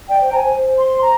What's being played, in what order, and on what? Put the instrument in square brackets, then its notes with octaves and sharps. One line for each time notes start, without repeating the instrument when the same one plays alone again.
[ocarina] D5 [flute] G5
[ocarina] C5
[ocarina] C5 [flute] A#5
[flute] G#5
[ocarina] C5
C5
[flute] C6
A#5